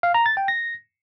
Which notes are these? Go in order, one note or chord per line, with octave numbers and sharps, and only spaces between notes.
F5
A#5
A6
G5
A#6